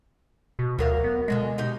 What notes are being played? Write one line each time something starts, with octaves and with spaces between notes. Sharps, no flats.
B2
D2 F#3 A#4 F5
B3
F#2 B2 D3 G#3
B2 D#4 G4